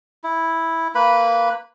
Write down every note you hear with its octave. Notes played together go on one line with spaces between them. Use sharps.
E4
A#3 B4 B5